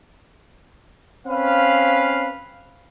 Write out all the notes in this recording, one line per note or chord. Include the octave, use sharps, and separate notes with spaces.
C4 C#4 B4 F5